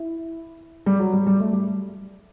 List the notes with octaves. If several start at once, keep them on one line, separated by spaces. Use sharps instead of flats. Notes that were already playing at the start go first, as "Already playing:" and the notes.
Already playing: E4
G3
F#3
G3
G3
A3
G3